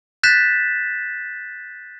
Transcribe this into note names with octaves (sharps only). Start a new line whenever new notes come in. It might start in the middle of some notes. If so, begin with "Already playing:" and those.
F#6 G6 A6 B6 E7